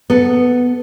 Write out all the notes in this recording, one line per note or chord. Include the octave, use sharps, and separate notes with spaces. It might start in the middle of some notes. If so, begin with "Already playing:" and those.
B3 A4